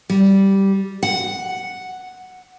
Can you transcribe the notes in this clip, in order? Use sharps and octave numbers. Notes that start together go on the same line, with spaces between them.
G3
F#5